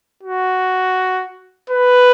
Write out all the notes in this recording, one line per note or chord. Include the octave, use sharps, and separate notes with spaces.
F#4
B4